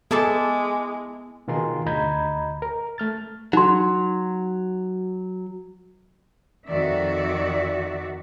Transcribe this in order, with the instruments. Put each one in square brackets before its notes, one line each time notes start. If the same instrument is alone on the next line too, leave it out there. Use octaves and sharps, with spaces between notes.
[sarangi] G#3 [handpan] B3 [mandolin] E4 A5 D6 [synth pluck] G#4 A4
[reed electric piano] B2 D#3 F4 G#4 A#4 C6
D2 D#5 A#5 B5 G6 G#6
A#4
A3 F6 A6
[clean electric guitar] F#3 [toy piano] D#4 C6
[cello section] F2 D#3 F#4 D5 E5